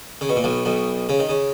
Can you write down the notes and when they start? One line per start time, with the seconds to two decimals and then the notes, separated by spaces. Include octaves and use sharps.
0.21 C#3
0.29 B2
0.36 A#2
0.44 B1 B2
0.65 B1 B2
1.09 C#3
1.19 D#3
1.29 C#3